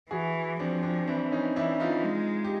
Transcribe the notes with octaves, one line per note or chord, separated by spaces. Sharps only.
E3 F#4 G#4
F3 C4 D4
C4 D4
E3 C4 D4
C#4 D#4
E3 D4 E4
D#4 F4
G#3
G4